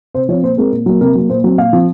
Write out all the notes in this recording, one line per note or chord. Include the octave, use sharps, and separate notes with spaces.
C3 C5
F3 C4 C#5
A#2 C5
G#3 C4 A#4
A#2
F#3 A#3
C3 A#4
F#3 A#3
A#2 C5
F#3 C4
A#2 F5
F3 C4